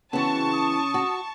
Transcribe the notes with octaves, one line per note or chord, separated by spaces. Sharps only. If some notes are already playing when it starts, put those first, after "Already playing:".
C#3 E3 B3 C4 F#4 A5 C#6
D#6
F#4